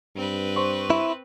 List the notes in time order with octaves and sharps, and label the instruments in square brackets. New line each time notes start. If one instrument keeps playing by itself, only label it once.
[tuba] G2 [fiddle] C4 B4
[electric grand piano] C5 C6 C#6
[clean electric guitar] E4